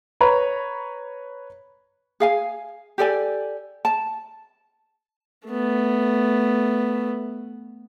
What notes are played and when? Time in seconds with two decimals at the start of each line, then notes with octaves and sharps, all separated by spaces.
0.21 B4 C#5 A#5 B5
2.20 G#4 F5 G#5
2.98 G4 A4 D5 G#5
3.85 A5
5.47 A3 B3